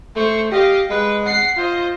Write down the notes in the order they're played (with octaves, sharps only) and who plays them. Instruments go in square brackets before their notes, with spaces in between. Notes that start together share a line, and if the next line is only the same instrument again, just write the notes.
[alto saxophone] A3 [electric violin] C5 C#6
[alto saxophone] G4 [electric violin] D#5 F5
[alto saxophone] G#3 [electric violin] B4
[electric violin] F#5 C7
[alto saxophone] F4 [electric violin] C5 D#5